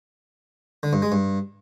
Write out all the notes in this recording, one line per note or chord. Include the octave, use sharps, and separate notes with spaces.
D3
G2
G#3
G2